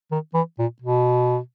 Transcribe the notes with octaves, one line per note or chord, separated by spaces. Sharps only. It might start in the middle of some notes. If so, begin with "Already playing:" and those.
D#3
E3
A#2
B2